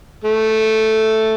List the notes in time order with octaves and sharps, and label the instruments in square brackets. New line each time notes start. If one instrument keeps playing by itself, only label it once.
[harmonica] A3